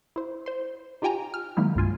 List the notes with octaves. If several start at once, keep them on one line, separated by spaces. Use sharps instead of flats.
E4 C5
C5 C6
D#4 F4 G4 G5 G#5 A#5
F6
D#3 F#3 G#3 A#3 D#4 E4
C2 G2 F4 G#5